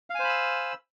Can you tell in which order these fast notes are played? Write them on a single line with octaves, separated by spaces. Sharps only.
F5 G#5 C5 B5 E6